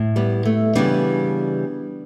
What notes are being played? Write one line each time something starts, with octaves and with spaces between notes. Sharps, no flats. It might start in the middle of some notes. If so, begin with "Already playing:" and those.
Already playing: A2
G3 B3
A3
C#3 E3 G3 B3 D4